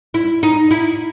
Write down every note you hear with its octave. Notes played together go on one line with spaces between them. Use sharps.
E4
D#4
E4